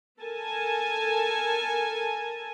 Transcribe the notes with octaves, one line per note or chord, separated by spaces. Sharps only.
A4 A#4 G#5 A5